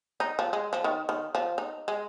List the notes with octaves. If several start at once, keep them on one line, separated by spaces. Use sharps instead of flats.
D#4
F3
G#3
F3
D#3
D#3
F3
D#4
G#3